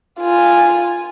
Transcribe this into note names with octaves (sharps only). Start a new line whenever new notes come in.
F4 G#5